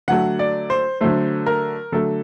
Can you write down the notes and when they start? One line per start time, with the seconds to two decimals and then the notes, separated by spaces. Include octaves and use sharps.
0.08 D3 F#3 A3 F#5
0.39 D5
0.70 C5
1.01 D3 F#3 A3 C5
1.46 A#4
1.92 D3 F#3 A3 A4